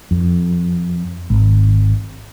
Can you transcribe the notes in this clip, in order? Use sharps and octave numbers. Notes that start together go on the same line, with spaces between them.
F2
G#1